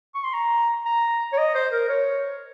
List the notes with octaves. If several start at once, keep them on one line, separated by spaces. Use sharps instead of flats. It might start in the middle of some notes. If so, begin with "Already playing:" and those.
C#6
C6
A#5
A#5
C#5
D#5
C5
A#4
C#5